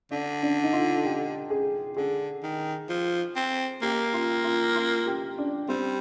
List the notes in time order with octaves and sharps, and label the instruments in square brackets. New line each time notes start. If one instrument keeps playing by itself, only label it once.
[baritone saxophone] D3 [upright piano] D4
[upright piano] D4
D#4
F4
G4
G#4
[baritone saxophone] D3 [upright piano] G#4
[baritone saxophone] D#3
F3
C4
[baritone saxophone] A#3 [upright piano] G4
[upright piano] F4
F4
F4
G4
D4
[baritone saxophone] G3 [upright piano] C4